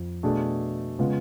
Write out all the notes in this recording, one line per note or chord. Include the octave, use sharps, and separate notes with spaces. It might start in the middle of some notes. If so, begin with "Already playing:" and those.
Already playing: F2 F3
B2 A3 D4 G#4
C#3 G#3 B3 F4